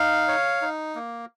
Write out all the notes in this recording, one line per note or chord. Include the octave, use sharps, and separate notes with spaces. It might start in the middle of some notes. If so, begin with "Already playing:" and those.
Already playing: D#4 F5
C#5
D#4
A#3